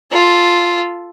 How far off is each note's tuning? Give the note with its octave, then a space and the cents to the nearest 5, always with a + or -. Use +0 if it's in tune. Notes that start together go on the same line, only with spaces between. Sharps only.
F4 +0 A4 +0